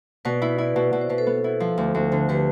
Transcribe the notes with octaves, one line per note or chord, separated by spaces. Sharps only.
B2 B4 D5
E4
E4 B4 D5
B2
B2 D5
C5
B2 B4
A4 C5
B3
E4
F3
D2
D2
D3
D3 G4 B4